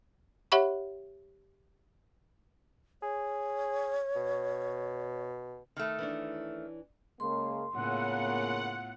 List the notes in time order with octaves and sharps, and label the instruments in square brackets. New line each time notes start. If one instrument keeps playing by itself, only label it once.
[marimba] G4 C#5 E5 F#5 B5 C#6
[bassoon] G#4 [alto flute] C#5
[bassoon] B2
[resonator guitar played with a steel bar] D#3 A3
[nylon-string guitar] E3 C#4 D4
[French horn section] C#3 G#3 A#3 [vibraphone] C6
[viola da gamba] A2 B3 F4 [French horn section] C#3 A#3 [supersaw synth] F#5